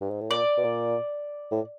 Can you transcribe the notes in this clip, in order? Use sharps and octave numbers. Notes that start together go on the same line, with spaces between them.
G2
G#2
A2
A#2 D5
B2
A#2
A2